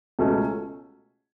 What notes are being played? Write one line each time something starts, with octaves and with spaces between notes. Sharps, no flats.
C#2 B2 A3 C#4